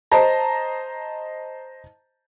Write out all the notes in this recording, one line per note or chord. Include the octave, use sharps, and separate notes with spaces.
C5 D#5 A5 A#5